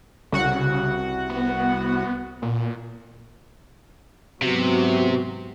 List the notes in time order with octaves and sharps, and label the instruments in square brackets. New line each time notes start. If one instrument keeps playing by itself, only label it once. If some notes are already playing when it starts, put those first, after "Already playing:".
[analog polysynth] C2 F#4 F#5 [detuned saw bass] C#3
[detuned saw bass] B3
A#2
[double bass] G#2 F#3 [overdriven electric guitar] C3 [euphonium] B3 [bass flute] F#4